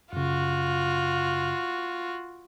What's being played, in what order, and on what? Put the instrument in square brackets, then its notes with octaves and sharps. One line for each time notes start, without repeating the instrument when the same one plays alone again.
[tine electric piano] F#2 C#3 [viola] F4 F#4